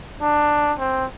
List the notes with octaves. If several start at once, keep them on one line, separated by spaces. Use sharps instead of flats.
D4
C4